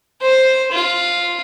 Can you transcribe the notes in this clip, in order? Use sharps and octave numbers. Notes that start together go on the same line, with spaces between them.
C5
F4